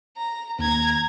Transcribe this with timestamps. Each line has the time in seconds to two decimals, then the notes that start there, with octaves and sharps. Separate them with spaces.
0.16 A#5
0.59 D#2 A#5 G#6